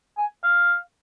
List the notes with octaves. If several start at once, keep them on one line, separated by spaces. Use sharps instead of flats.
G#5
F5